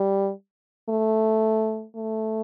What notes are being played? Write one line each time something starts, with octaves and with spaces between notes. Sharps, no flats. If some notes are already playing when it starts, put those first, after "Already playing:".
Already playing: G3
A3
A3